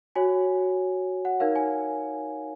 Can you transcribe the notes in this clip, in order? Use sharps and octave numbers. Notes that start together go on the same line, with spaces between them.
F#4 C#5 G#5
F#5
D#4 A#4 C#5 F5
G#5